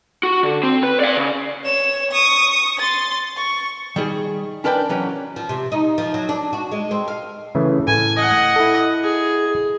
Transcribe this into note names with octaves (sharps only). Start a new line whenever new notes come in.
F#4
D3
C4
B4
D5 F5
C#3
C#5 E7
C#6 D#6
C6 A6
C#6
D#3 G3 G#4
C#4 D4 A#4 B4 D5 G5
E3 F#3 C#4
F3
C3
D#4
F3
F#3
D4
F#4
G#3
C4
F5
C#3 E3 A3
A2 G#5
D#5 F#5
E4 A4
G#4